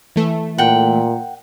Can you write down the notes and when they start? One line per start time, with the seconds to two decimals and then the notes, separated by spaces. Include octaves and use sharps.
0.16 E3 A3
0.58 A#2 F#5 G5